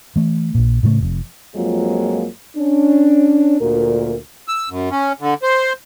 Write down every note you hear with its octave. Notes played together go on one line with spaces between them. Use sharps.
E3 A3
A#1 A#2
A2 C#3 F3 A3
F1 F2
F2 F3 F#3 G#3 A#3 F4
C#4 D4
D2 A#2 A#4
E6
F#2
C#4
D3
C5